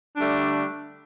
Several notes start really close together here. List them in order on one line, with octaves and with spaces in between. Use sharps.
D4 G3 A3 D3